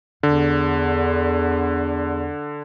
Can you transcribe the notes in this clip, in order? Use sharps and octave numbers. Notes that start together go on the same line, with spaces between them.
E2 D3